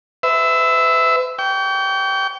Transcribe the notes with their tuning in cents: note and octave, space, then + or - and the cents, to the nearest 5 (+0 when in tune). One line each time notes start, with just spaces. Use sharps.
B4 +40 E5 -5
G5 -15 C#6 +40